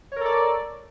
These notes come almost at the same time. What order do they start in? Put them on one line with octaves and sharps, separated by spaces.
C#5 A#4 A4 D5